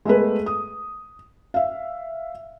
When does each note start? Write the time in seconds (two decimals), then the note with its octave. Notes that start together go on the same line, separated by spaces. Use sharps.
0.05 G#3 A3 B3 G#4 A#4 B4
0.46 D#6
1.54 E5 F5